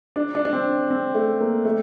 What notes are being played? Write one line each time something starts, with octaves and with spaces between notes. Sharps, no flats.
D4
D4
D4
C4
C4
A3
A#3
A3